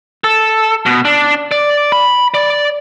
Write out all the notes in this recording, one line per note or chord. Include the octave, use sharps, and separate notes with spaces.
A4
B2
D4
D5
B5
D5